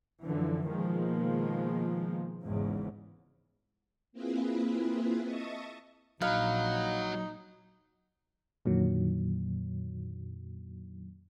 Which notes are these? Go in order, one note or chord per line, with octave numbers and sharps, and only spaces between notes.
F#2 D3 E3 F3
B2 D#3 F3 G#3 A#3
G#1 E2 G#2 C#3
A#3 C4 E4 F4 G#4 B4
D#5 E5 A5 C#6 D#6
A#1 F#3 D#4 B4 F5
F2 A#2 D3 D#3 F#3